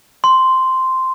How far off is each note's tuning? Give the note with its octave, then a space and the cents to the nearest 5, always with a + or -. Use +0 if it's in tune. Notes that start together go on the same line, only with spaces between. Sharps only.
C6 -5